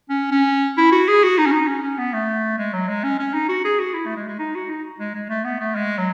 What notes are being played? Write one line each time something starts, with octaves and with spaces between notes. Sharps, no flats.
C#4
C#4
E4
F#4
G#4
F#4
D#4
C#4
D#4
C#4
C#4
B3
A3
G#3
F#3
G#3
C#4
C#4
D#4
F#4
G#4
F#4
E4
A3
G#3
G#3
D#4
F#4
D#4
G#3
G#3
A3
B3
A3
G#3
F#3